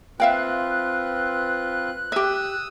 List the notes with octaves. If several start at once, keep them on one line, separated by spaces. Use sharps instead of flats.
C4 F4 B4 E5 F5 G5 F#6
G4 E5 D#6 E6